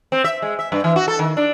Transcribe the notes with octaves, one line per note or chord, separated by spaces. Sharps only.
C4
E5
G#3
E5
G2
E3
F#4
A4
D#3
D4